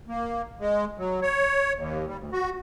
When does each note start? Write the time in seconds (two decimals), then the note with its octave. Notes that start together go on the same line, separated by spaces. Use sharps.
0.08 A#3
0.59 G#3
0.98 F#3
1.22 C#5
1.76 D#2
2.06 G3
2.18 D2
2.32 F#4